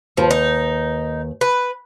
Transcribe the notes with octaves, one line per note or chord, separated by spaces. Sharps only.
D#2 F3 B4
D#4
B4